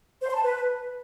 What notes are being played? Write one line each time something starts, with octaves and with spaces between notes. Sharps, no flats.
C5
C6
A5
B4